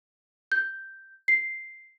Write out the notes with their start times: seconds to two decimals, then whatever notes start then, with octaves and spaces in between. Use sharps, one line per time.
0.52 G6
1.28 C7